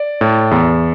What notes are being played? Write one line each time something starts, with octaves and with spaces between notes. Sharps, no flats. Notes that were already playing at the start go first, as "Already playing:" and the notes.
Already playing: D5
A2
E2